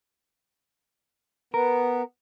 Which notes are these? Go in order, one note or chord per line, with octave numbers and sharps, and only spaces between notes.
B3 A#4